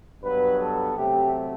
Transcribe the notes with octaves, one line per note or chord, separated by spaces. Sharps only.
G2 F#3 B3 B4
A4
C3 F#3 A3 C4 G4